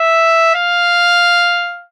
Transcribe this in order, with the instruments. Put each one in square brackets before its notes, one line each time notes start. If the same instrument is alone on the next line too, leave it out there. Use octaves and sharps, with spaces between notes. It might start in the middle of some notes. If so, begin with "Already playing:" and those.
Already playing: [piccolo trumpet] E5
F5